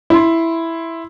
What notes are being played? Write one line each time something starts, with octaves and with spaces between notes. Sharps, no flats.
E4 C6